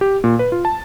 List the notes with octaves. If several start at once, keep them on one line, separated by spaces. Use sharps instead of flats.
G4
A#2
B4
F4
A5